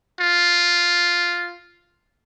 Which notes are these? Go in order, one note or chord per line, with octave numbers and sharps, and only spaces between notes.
F4